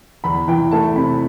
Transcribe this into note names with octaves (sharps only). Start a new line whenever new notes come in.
E2 B5
E3 G5
A3 A5
C3 B5